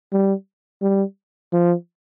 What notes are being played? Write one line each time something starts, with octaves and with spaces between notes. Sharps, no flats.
G3
G3
F3